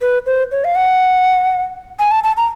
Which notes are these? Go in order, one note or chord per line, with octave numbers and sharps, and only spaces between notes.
B4
C5
C#5
F5
F#5
G#5
A5
A5
A#5